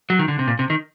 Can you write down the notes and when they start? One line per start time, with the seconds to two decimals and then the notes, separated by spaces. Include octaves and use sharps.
0.10 F#3
0.19 D#3
0.28 D3
0.39 C3
0.47 A#2
0.59 C3
0.70 D#3